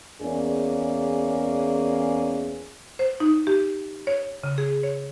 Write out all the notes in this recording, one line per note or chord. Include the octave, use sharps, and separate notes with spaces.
E2 A#3 C#4 G#4 D5
C5
D#4
G4
C#5
C#3
G#4
C#5